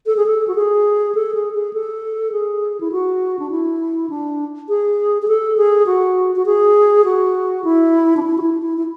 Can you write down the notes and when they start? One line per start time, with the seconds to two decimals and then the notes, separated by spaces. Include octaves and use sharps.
0.06 A4
0.17 G#4
0.26 A4
0.48 F#4
0.55 G#4
1.15 A4
1.34 G#4
1.54 G#4
1.73 A4
2.32 G#4
2.80 E4
2.92 F#4
3.39 D4
3.51 E4
4.10 D4
4.69 G#4
5.22 G#4
5.28 A4
5.57 G#4
5.86 F#4
6.36 F#4
6.46 G#4
7.05 F#4
7.64 E4
8.17 D4
8.23 E4
8.38 F#4
8.42 E4
8.62 E4
8.78 E4